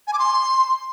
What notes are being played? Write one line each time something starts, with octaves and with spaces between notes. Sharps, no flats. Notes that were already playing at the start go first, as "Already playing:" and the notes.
G#5
D6
C6